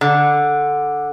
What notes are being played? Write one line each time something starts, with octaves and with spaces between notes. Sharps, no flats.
D3